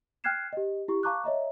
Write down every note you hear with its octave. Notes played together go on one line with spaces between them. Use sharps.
G5 F6 F#6 G#6 C7 E7
G4 D#5
E4 G4 C#6
F5 A5 A#5 C#6 D6 F#6
C#5 D#5 E5 A#5